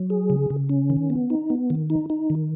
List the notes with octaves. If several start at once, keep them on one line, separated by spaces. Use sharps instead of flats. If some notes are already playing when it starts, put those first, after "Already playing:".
Already playing: F#3
G#4
C#3
C#3
C#4
D#3
B3
D#4
B3
D#3
D#4
D#4
D#3